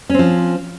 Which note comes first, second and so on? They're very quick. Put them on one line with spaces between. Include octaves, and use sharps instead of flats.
C#4 C4 F3